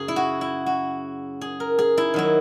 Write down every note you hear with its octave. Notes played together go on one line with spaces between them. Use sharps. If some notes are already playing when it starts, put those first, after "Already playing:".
Already playing: F#2 C#3 F#3 G#4
E4
F#4
E4
F#4
G#4
A#4
G#4
E4
D#3 F#3 E4